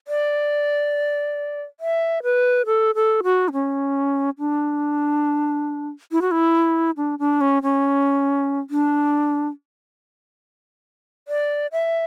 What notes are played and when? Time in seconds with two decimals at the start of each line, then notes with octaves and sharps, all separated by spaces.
0.08 D5
1.80 E5
2.23 B4
2.66 A4
2.95 A4
3.24 F#4
3.48 D4
3.52 C#4
4.39 D4
6.12 E4
6.21 F#4
6.31 E4
6.97 D4
7.19 D4
7.41 C#4
7.62 C#4
8.70 D4
11.28 D5
11.72 E5